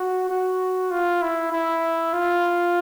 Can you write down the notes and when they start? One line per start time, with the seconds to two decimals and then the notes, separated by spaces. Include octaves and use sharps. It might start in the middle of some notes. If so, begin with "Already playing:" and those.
Already playing: F#4
0.30 F#4
0.91 F4
1.22 E4
1.52 E4
2.13 F4